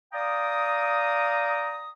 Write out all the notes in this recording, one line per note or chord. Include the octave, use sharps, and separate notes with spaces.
D5 F5 G5 A#5 D#6